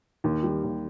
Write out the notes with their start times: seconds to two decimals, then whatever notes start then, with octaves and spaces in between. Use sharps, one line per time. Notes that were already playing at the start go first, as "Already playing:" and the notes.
0.24 D#2
0.43 G3
0.64 D#2